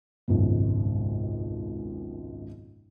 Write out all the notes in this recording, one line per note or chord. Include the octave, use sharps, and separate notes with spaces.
G#1 C#2 F#2 B2